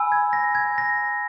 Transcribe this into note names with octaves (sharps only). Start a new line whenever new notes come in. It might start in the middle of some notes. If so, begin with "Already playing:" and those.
Already playing: G#5 B5 E6
G#6
A#6
G#6
A#6